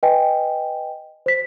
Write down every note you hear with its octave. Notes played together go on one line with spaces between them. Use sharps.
B4 D#5 G5 G#5
C5 B6